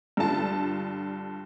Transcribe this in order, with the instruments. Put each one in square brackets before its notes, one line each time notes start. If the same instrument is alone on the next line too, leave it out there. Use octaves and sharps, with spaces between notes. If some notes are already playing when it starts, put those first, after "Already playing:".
[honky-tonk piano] G2 D3 F4 A5